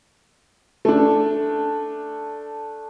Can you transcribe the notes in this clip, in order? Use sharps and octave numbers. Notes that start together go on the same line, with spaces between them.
A3 D4